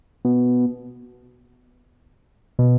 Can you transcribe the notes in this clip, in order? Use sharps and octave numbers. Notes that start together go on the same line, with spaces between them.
B2
B2